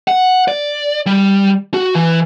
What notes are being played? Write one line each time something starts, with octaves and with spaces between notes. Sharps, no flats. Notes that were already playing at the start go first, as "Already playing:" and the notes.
F#5
D5
G3
F#4
E3